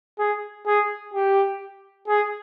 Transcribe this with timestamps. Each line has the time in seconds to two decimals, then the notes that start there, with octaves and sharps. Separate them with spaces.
0.19 G#4
0.66 G#4
1.14 G4
2.08 G#4